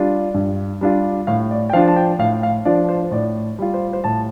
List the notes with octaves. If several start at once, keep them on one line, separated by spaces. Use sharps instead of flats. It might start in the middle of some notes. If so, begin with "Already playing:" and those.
Already playing: G3 D4 F4 D5
G2
G3 D4 F4
A2 F5
D5
G5
F3 D4 F4 F5
A5
G5
A2 F5
F5
F3 D4 F4 D5
C5
C5
A2 D5
G3 F4
C5
C5
A2 A5